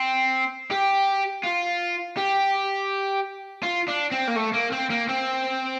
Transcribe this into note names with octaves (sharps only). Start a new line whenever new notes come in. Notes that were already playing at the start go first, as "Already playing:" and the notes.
Already playing: C4
G4
F4
G4
F4
D4
C4
A#3
A3
A#3
C4
A#3
C4